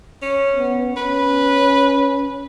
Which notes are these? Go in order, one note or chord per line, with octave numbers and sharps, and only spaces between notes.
C#4
B3
C#4 B4